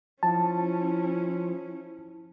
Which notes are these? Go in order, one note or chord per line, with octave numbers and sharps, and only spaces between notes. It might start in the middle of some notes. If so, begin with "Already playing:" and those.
F3 C#4 E4 A5